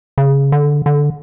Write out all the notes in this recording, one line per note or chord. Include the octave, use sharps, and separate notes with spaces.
C#3
D3
D3